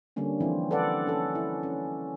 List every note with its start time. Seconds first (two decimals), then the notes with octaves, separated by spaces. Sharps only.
0.16 D3 G3 A#3 C#4 D4
0.40 E3 F3 C4 E4
0.71 A4 B4 D5 F#5
1.07 C#4 A4
1.35 E4
1.63 C#4